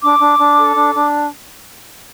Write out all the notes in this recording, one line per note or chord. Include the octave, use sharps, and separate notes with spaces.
D4 D6
D4
D4
A4
D4
D4